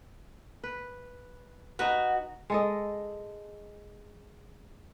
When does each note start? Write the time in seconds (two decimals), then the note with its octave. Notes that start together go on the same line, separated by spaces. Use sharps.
0.64 B4
1.79 D#4 F#4 B4
2.50 G#3 A4 D#5